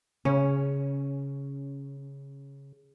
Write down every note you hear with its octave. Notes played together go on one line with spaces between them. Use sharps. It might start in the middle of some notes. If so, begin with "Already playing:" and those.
C#3 C#4